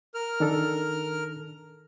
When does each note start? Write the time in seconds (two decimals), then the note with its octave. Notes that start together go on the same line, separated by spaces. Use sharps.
0.14 A#4 F6
0.40 D#3 D4 A4